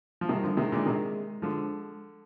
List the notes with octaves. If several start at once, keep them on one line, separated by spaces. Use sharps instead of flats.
F3
C3 D#3 G3
D3 F3
C3 D#3 G#3
A#2 D3
C3 D#3
D3 F3 G#3